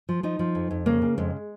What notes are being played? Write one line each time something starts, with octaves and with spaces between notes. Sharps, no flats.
F3
F3 D#4
F3
F2
F2
C#3 A#3
C#3
F2 G#3